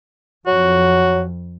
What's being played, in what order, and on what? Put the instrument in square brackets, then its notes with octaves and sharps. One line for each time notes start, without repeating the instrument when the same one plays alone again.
[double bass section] F2 [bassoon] F#3 [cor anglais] F#4